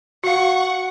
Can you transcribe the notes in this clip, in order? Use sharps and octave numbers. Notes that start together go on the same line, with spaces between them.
F#4 F5 F#5 C#6